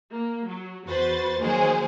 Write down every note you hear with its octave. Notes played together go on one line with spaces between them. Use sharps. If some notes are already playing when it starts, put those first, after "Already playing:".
A#3
F#3
E2 F#4 B4 C5 A6
D#3 F#3 G#3 A#3 G#4 C5